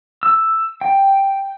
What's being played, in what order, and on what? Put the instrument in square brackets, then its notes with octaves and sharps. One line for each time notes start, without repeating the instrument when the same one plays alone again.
[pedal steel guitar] E6
G5